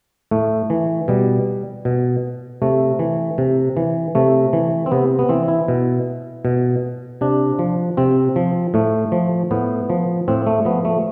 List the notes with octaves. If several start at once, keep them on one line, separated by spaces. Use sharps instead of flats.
A2 A3
E3
B2 G3
B2
C3 A3
E3
C3
E3
C3 A3
E3
C4
C3 B3
B3
E3 C4
E4
B2
B2
C3 D4
F3
C3 C4
F3
A2 A3
F3
A2 B3
F3
A2 C4
A3
F3 B3
A3